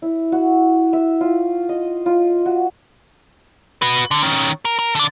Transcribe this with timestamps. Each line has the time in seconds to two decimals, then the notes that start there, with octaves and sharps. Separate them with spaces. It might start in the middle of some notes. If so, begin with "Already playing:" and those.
0.02 E4
0.32 F#4
0.93 E5
1.21 F4
1.69 D#5
2.06 F4
2.46 F#4
3.82 F#4 B4
4.11 D3
4.23 D#3 C#4
4.65 A#4
4.79 A#4
4.95 D3 D5